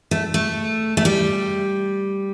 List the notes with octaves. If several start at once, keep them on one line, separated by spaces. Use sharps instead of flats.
A3
A3
A3
G3